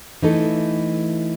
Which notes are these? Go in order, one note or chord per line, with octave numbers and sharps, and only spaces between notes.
E3 A3 D#4 A4